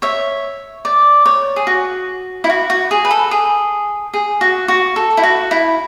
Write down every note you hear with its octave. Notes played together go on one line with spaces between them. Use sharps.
C#5 E5
D5
C#5
G#4
F#4
E4
F#4
F#4
G#4
B4
A4
G#4
G#4
F#4
F#4
A4
E4
F#4
E4